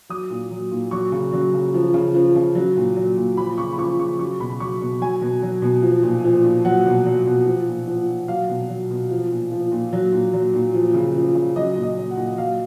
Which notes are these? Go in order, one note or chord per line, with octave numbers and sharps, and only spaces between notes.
F#3 D#6
A#2
F#3
A#2
F#3 C#6
C#3
F#3
C#3
F3
C#3
F3
C#3
F#3
A#2
F#3
A#2
F3 B5
C#3 C#6
B5
F3 C#6
C#3 C#6
F#3 C#6
B2 B5
F#3 C#6
B2
F#3 G#5
B2
F#3
B2
F3
A#2
F3
A#2
F#3 F#5
B2
F#3
B2
F3
A#2
F3
A#2
F#3 F5
B2
F#3
B2
F3
A#2
F3
A#2
F#3
A#2
F#3
A#2
F3
C#3
F3
C#3
F#3 D#5
A#2
D#5
F#3
F#5
A#2
F#3 F5